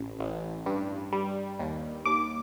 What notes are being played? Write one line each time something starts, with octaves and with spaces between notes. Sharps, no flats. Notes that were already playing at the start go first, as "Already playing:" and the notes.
Already playing: A1
A1
G2
G3
D#2
D#2 D6